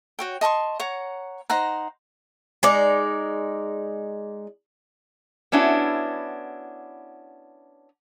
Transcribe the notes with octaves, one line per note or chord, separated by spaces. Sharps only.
F#4 C#5 G5
D#5 A5 C6 C#6
C#5 F#5 A#5
D#4 C5 F#5 A#5
G#3 D#4 D5
B3 C#4 D4 E4 F#4